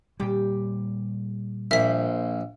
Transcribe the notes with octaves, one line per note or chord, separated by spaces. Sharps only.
A#2 G3 G4
A#1 F3 A#3 E5 B6